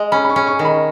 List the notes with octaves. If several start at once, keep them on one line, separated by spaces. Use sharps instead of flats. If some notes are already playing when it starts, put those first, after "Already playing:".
Already playing: G#3
C#4 B5
B5
C#6
C#4
C#6
D#3
B5